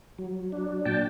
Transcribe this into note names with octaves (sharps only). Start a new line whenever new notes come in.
F#3
D4
A#2 G5 A5